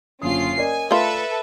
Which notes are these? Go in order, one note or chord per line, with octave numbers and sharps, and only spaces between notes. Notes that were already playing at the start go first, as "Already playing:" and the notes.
F#1 D3 C#4 F4 D#6 C7
A#4 D5 D#5 G#5
A3 F4 A4 B4 E5